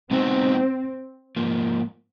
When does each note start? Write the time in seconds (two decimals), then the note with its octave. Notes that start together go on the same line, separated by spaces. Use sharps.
0.11 G#3 B3 C4 D#4 F#4
1.36 G#2 F3 A#3